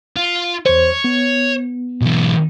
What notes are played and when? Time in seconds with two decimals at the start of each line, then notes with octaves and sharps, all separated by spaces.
0.16 F4
0.66 E2 C5 C#5
1.04 B3
2.01 B1 E3